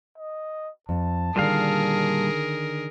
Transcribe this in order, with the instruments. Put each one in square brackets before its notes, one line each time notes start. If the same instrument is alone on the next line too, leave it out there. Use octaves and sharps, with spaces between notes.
[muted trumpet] D#5
[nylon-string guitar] F2 [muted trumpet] A5
[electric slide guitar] A#2 G3 F5 [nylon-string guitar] D3 D#3 [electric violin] G#4 A#4